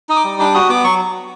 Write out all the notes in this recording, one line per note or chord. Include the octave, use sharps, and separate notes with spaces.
D#4 D#6
D6
G3
D4 D6
F#4 D#6
B3 D6
F#3 C#6